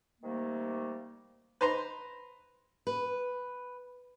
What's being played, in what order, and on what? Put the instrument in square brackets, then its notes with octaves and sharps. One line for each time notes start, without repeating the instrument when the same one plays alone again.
[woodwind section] C3 D#3 G3 A3 A#3
[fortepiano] B4 C5 A#5 C6
[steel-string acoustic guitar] B4